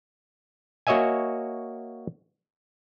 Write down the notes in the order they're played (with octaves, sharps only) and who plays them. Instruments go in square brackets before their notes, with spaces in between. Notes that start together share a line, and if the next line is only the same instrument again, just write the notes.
[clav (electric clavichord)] A#3 F#4 C#5 D#5 E5 G#5